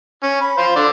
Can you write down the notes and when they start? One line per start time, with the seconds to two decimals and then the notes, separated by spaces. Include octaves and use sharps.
0.23 C#4
0.41 B5
0.58 C5 F5
0.76 D3 D5